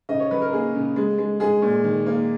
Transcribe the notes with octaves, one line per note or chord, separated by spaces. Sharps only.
C#3 D#5
C#5
F#3 B4
A#4
A#3 G#4
C#3
G#3
G#3
G#3 G#4
A#2
D#3
A#3